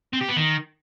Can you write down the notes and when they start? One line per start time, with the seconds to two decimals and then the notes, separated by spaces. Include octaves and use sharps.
0.13 C4
0.21 G4
0.29 B3
0.36 D#3